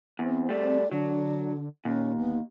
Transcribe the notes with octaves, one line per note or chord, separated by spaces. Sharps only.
E2 C4
G3 A3 D5
D3 F#3 D4
D#2 A#2 C#4
D1 B3